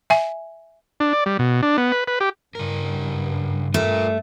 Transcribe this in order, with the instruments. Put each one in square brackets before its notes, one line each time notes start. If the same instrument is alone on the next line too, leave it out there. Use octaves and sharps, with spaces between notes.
[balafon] E5 G#5
[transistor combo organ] D4
D5
G3
B2
D4
B3
B4
B4
G4
[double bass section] G2 [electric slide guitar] C#3 A#4
[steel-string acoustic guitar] A3 [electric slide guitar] F4 A#4